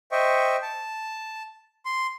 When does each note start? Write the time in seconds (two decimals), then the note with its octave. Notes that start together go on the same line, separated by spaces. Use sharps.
0.12 C5 D#5 E5 G5 C#6
0.63 A5
1.85 C6